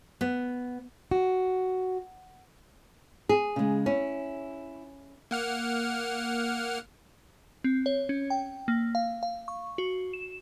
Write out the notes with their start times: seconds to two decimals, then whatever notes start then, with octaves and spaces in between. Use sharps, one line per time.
0.21 B3
1.11 F#4
3.29 G#4
3.56 C#3 G#3
3.86 C#4 E4
5.31 A#3 F#5 F6
7.64 C4
7.86 C#5
8.09 C#4
8.30 G5
8.68 A#3
8.95 F5
9.23 F5
9.48 C#6
9.78 F#4
10.13 E7